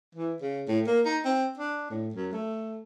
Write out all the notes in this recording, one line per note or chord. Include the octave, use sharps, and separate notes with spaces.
E3
C#3
A2
A#3
D#4
C4
D4
A2
F#2
A3